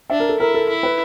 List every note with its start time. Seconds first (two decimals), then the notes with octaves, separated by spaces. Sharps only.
0.10 D4 E5
0.20 A#4
0.29 A4
0.39 E4 A#4
0.54 A4
0.69 E4
0.83 B4